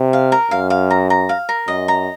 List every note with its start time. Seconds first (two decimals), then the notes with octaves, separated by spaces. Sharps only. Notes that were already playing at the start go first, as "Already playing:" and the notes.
Already playing: C3
0.13 F5
0.32 A#4
0.51 F#2 F5
0.70 F5
0.90 A#5
1.10 A#5
1.29 F5
1.49 A#4
1.68 F#2 D#5
1.88 A#5